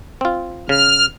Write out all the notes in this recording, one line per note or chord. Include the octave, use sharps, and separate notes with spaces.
C4 F4
C#3 F6